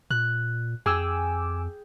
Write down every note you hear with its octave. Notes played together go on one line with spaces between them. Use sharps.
A#2 F#6
F2 G#4 G5 G#5 D6 E6